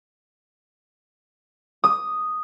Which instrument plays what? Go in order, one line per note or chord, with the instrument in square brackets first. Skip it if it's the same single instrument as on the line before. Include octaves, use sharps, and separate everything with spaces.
[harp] D#6